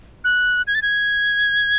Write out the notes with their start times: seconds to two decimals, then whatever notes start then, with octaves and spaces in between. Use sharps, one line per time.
0.24 F#6
0.67 G#6
0.75 A6
0.82 G#6